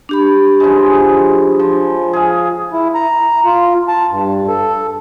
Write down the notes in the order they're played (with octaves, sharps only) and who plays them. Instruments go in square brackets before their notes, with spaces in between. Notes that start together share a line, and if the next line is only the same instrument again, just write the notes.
[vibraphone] D4 G4 B5
[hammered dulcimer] C#3 F3 G#3
F3
G#4 F5
[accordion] E4
A#5
F4
A5
G2
A4